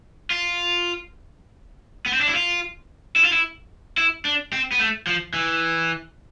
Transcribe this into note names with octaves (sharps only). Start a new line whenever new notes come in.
F4
B3
C4
D4
E4
F4
E4
F4
E4
E4
D4
C4
B3
A3
F3
E3